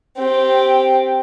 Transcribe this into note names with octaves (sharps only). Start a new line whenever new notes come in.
C4 G4